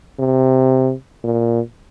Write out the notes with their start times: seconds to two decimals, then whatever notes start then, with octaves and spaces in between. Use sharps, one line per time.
0.19 C3
1.24 A#2